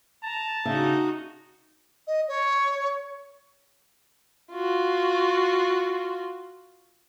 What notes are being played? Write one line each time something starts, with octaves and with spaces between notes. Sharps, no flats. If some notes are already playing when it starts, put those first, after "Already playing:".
A5 A#5
C#3 D4 D#4 F#4 E5
D#5
C#5
F4 F#4